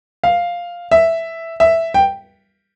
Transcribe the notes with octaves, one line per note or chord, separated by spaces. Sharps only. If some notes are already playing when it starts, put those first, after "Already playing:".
F5
E5
E5
G5